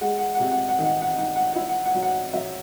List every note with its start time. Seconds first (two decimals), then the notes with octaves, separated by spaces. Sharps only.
0.01 G#3 F#5
0.18 F#5
0.35 F#5
0.39 C3
0.51 F#5
0.68 F#5
0.79 D#3
0.85 F#5
1.02 F#5
1.17 D#4 F#5
1.36 F#5
1.52 E4 F#5
1.69 F#5
1.85 F#5
1.94 F#3
2.03 F#5
2.33 F#3 E5